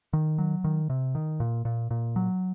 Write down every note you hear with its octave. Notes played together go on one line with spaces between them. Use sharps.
D#3
F#3
D#3
C3
D#3
A#2
A#2
A#2
F#3